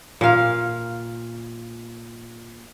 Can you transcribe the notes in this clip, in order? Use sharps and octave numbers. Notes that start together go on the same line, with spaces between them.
A#2 F5